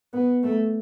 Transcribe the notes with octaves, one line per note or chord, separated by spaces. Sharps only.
B3
A3